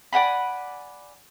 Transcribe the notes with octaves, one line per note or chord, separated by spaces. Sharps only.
D5 F#5 G#5 B5